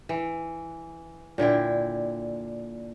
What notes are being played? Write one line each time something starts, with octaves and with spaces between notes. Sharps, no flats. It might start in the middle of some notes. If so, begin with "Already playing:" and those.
E3
A#2 D3 E4 G5